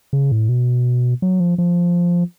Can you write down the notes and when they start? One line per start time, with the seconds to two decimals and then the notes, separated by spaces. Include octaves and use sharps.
0.13 C#3
0.32 A2
0.49 B2
1.22 F#3
1.40 F3
1.58 F3